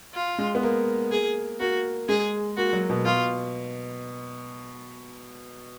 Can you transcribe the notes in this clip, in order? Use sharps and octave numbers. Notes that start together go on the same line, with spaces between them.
F4
G#3
B3
A#3
G#4
A#3 F#4
G#3 G#4
A#3 F#4
F#3
B2
B2 F4